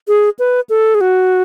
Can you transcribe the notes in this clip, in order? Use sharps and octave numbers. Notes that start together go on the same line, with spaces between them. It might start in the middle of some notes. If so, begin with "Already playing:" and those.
G#4
B4
A4
G#4
F#4